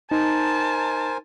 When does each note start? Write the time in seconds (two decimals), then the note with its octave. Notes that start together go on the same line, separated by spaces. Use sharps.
0.11 D#4 A#4 C5 G#5 A5